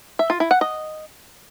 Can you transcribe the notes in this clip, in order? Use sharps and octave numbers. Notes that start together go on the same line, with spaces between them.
E5
F4
E4
F#5
D#5